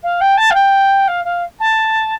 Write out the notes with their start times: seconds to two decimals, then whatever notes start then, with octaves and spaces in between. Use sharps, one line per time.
0.03 F5
0.20 G5
0.37 A5
0.50 F5
0.54 G5
1.07 F5
1.24 F5
1.59 A5